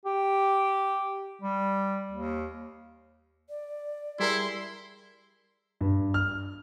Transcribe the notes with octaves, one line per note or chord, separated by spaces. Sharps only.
G4
G3
D#2
D5
G3 E4 G#4 A#4 C6
G2
F6